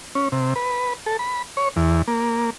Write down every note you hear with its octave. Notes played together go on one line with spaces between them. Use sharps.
C#4
C3
B4
A4
B5
C#5
E2
A#3